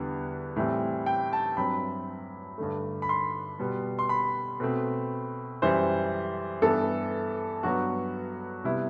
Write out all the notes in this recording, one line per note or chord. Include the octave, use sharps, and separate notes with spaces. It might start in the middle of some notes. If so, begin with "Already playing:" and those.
Already playing: E2 D3 G3 B3
A2 E3 G3 C4
G5
A5
G2 F#3 C4 B5
G2 D3 A3
B5
C6
B2 G3 B3
C6
B5
B2 A3 C4
F#2 E3 G3 C5
G2 E3 B3 A4
G2 F#3 B3 F#4
C3 G3 B3 E4